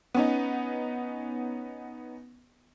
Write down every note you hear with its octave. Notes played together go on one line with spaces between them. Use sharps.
B3 C#4 D#4